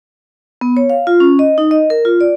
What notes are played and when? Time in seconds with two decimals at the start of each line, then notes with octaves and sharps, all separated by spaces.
0.61 B3
0.77 C#5
0.90 F5
1.07 F4
1.20 C#4
1.39 D#5
1.58 D#4
1.71 D#5
1.90 A#4
2.05 F4
2.21 D5